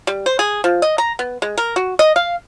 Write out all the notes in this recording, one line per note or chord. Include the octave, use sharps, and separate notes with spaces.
G3
C5
G#4
F3
D#5
A#5
B3
G#3
A#4
F#4
D#5
F5